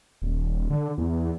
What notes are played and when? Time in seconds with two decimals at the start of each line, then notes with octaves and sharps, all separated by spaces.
0.22 D#1
0.70 D3
0.98 E2